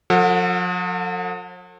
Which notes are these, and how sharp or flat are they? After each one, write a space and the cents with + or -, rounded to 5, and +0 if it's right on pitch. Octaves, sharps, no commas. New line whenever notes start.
F3 +45 A4 +35 F#5 -15